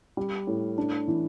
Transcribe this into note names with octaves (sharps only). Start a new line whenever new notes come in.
G3
A2
D4
E3